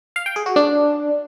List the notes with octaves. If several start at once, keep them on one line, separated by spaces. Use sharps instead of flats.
F5
G5
G#4
F#4
D4